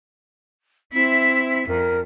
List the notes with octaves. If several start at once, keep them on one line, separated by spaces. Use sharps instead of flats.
C4 E4 E5
F2 A#4